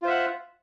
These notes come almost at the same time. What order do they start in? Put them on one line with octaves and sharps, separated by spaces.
F4 C5 E5 F#5